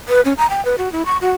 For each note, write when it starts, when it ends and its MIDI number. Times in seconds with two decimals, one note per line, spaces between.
0.08 0.21 71
0.25 0.33 61
0.38 0.49 82
0.50 0.64 79
0.65 0.75 71
0.78 0.91 66
0.92 1.03 64
1.06 1.17 85
1.21 1.33 66